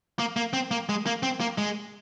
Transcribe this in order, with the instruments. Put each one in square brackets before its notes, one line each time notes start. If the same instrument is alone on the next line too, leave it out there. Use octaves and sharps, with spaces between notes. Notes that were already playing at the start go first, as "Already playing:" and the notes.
[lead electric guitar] A#3
A#3
C4
A#3
G#3
A#3
C4
A#3
G#3